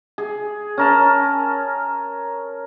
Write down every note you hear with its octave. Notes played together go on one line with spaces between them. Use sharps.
G#4
C#4 A#4 A5